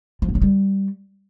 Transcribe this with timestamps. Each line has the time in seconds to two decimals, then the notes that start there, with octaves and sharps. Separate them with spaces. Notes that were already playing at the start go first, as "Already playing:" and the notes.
0.22 F3
0.29 B3
0.35 F#3
0.42 G3